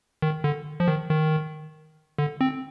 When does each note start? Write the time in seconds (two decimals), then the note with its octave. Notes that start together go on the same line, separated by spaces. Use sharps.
0.22 D#3
0.44 D3
0.80 F3
0.88 D#3
1.09 D#3
2.18 D3
2.41 C4